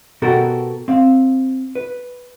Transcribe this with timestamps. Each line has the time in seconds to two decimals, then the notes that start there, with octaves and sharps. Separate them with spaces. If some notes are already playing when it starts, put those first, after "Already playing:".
0.22 B2 B3 F#4 G4 A4 A#4
0.88 C4 F5
1.75 B4